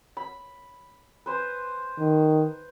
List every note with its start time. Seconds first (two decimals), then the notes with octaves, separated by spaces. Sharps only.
0.17 B5
1.26 B4 C5 G#5
1.98 D#3